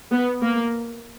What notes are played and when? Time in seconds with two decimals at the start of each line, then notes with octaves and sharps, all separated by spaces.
0.12 B3
0.42 A#3